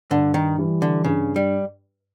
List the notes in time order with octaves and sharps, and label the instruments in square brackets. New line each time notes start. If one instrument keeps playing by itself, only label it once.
[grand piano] G2 [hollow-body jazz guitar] D3
[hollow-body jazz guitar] D#3
[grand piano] E3 G3
[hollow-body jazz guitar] D3
[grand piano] G2 [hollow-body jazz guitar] C#3
[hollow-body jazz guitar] G3